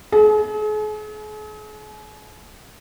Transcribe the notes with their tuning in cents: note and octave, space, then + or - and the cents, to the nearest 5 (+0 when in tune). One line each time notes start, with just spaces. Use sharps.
G#4 +45